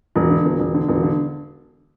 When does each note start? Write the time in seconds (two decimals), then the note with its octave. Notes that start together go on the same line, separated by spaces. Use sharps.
0.16 E1
0.30 D3
0.45 E1
0.60 E1
0.74 D3
0.88 E1
1.03 D3